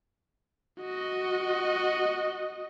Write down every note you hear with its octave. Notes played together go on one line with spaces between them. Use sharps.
F#4 D#5